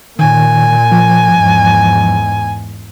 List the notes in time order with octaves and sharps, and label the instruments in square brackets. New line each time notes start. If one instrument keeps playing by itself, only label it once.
[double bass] A#2 [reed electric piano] D#3 [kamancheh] G#5
[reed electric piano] F3
[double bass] E2 G#2